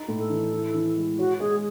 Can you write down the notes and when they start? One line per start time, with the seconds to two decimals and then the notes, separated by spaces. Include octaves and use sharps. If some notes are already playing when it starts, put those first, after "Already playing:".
Already playing: D#4
0.08 A2
0.19 A4
0.30 E3
0.52 E4
0.74 E3
0.96 G#3
1.18 F#4 C#5
1.40 G#3 G#4